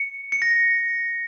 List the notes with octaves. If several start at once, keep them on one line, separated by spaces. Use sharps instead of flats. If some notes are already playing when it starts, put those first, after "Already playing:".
Already playing: C#7
C#7
A#6